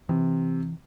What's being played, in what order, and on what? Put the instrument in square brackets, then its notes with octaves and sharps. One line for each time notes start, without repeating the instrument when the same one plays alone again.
[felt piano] C3 [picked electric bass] E3